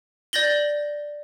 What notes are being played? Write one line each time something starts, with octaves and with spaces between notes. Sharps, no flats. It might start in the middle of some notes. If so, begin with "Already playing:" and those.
D5 G6 A6 A#6 F#7 G7